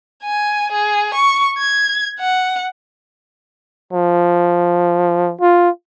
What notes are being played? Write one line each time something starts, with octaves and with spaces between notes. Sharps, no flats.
G#5
G#4
C#6
G#6
F#5
F3
F4